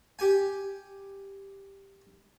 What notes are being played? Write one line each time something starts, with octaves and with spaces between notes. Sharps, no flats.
G4 G#5